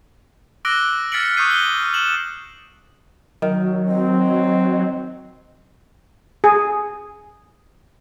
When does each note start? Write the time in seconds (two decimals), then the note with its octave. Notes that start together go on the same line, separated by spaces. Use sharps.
0.65 D6 E6 F#6 A#6 D7 G7
1.12 F6 A6 B6 C#7 D7 F#7
1.37 C#6 D#6 F#6 G6 C7 D#7
1.50 G7
1.93 E7 F#7 G7
3.42 D#3 F#3
3.88 C4 D#5
6.44 G#4